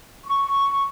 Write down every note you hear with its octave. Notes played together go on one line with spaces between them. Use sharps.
C#6